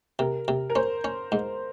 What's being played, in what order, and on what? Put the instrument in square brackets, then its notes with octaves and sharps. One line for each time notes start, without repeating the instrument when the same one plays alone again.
[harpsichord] C3 [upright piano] A#4
[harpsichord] C3
[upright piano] A#4
[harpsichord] C#4 [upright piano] C5
[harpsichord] C#4
G#2